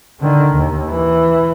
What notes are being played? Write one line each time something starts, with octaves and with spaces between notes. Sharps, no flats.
D3 D#3
D#2
E3